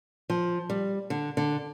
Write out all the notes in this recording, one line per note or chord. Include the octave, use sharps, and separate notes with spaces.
F3
G3
D3
D3